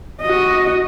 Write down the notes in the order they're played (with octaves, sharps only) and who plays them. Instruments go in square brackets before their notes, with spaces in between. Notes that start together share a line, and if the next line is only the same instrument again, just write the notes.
[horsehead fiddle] F#4 D#5